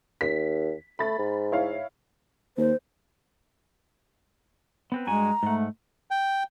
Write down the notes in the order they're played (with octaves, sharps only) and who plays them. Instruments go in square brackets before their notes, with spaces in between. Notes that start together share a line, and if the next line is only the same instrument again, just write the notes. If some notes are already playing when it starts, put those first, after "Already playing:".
[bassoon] D#2 [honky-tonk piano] B6
[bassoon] A3 [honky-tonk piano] B5 A6
[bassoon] G#2
[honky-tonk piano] E4 C#5 F5
[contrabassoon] D#2 [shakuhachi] C5
[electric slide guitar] B3 C4 B4
[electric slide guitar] G2 F#4 G#5 [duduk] G#3 [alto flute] A#5
[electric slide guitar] G#2 F#5 [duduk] A3
[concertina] G5